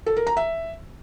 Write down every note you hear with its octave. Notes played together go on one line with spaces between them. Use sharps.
A4
A#4
A#5
E5